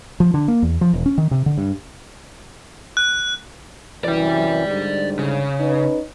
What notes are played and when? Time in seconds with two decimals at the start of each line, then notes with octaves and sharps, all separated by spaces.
0.20 F3
0.34 D3
0.48 A#3
0.62 E2
0.81 F3
0.93 E1
1.06 C#4
1.18 D#3
1.31 C3
1.46 D3
1.58 G2
2.97 F#6
4.04 F#2 C3 E3 D5 G5
4.67 G#2 D3 G3
5.19 C#3
5.60 C#4 D#4 B4